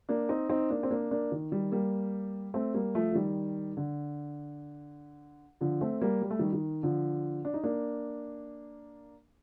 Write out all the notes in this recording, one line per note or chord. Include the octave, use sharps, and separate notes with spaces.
A#3 D4
C4 D#4
C4 D#4
A#3 D4
C4
A#3 D4
A#3 D4
D#3
D#3 G3
G3 A#3
A3 C4
G3 A#3
F3 A3
F3
D#3 G3
D3
D3 F3
A3 C4
G3 A#3
G3
A3
D#3 G3
D#3
D3 F3
D4
D#4
A#3 D4